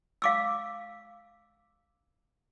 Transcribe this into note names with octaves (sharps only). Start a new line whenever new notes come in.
F5 D6 E6